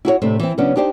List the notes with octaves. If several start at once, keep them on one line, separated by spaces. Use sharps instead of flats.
E4 F#4 A4 C#5
A2 C3 A3 C4 D4
E3 C4
C#3 F#3 B3 C#4 D4
D4 D#4 G4 C5 D5